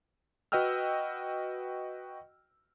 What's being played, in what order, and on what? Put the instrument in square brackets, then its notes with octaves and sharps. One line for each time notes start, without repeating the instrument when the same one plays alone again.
[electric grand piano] F#4 B4 D#5 G5 E6 F6